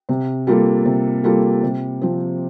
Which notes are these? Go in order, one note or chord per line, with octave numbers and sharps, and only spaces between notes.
C3
G3 A#3 F4 A4
C3
G3 A#3 F4 A4
C3
F3 C4